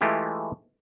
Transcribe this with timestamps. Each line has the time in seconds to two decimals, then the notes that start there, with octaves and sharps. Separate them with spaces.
0.01 E3 G#3 A3 E4 F4 G4